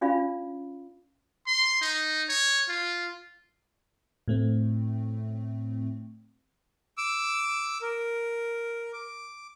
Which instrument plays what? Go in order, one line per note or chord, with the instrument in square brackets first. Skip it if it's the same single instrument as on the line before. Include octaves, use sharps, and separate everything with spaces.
[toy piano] C#4 D4 F4 D5 F5 B5
[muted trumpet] C6
D#4
C#5
F4
[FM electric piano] A2 A3 C4
[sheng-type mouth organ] D6 E6
A#4
D6